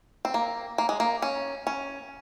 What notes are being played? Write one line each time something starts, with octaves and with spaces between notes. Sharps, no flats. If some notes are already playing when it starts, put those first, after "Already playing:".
C4
A#3
A#3
G#3
A#3
C#4
C#4